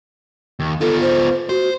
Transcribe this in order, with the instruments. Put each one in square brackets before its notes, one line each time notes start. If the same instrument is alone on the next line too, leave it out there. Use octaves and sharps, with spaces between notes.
[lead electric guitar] D#2
[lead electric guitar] B3 F4 [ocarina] A4
[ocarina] C5
[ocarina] F#4 [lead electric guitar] C5